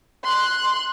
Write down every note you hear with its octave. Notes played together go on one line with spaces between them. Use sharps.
C6 F#6